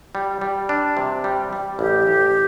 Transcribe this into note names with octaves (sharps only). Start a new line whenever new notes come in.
G3
G3
D4
C3
G3
G3
A1 G4
A1